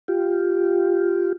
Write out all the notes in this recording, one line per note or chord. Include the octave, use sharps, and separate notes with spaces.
F4 G4